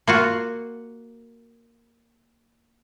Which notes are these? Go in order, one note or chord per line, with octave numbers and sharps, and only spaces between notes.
A#3 F4 F#4